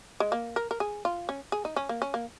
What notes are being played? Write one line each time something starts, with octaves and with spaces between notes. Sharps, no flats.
G#3
A#3
A#4
A#4
G#4
F4
C#4
G#4
D#4
C#4
A#3
C#4
A#3